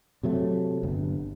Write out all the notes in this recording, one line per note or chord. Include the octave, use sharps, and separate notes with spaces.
C3 F#3 A3
G1 G2